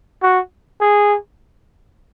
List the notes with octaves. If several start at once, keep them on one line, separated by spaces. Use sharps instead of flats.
F#4
G#4